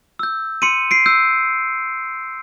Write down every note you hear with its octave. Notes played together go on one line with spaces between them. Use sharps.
E6 G6
C6 C#7 D#7
C7 D7
E6 G6